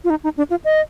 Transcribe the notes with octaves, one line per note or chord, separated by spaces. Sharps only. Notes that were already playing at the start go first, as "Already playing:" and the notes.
F4
D#4
D#4
D4
F4
D#5